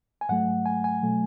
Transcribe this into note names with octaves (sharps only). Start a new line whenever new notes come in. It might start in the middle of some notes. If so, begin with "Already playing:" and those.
G#5
G#2 F#3 A3 F#5
G#5
G#5
B2 F#3 A3